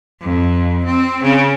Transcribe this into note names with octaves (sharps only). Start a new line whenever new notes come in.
F2
C4
C#3